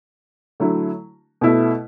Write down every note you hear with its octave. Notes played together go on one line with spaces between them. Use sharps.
D3 F#3 A3 E4
B2 A3 E4